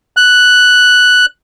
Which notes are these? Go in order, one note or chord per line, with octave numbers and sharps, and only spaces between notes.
F#6